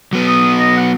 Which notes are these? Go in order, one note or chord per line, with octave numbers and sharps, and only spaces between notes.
F#3 B3
D#6
D#5
F#5